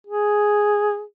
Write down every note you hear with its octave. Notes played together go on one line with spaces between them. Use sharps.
G#4